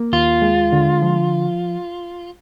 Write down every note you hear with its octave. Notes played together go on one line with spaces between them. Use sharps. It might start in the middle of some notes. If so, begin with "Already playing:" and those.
Already playing: A#3
D#2 F4
G#3
D3
F3